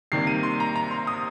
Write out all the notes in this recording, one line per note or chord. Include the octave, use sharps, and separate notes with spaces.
C3 D#3 G3 A#3 C7
D#7
C6
A#5
A#5
C6
D#6